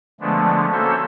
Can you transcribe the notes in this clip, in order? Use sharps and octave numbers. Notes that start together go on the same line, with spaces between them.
D3 F3 G#3 A3 B3 D4
A#3 C#4 F#4 A4 C5 E5